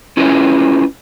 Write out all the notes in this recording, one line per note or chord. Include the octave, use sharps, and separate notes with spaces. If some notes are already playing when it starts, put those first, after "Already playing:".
C#4 E4 F4 G#4 B4 D#5